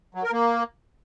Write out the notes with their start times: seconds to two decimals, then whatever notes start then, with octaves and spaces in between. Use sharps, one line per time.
0.15 F#3
0.23 A#4
0.32 A#3